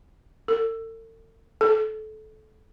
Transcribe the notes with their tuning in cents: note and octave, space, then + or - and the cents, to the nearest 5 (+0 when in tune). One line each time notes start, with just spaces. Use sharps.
A4 +45
A4 -25